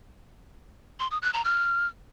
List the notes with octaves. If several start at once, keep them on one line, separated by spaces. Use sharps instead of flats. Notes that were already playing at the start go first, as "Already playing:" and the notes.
C6
D#6
F#6
A#5
F6